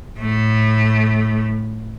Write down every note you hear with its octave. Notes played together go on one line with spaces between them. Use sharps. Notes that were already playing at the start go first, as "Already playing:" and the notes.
A2 A3